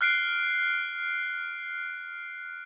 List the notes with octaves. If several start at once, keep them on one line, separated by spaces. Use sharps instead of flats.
F6 F#6 C7 D7